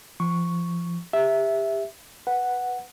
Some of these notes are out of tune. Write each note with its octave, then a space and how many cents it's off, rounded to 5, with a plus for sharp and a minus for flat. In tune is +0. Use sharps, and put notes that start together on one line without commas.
F3 -25 C#6 +0
G4 +30 E5 +0
B4 +0 F#5 +0